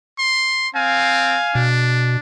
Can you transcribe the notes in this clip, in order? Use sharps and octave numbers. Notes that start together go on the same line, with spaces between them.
C6
C4 F5 G#5
B2 D4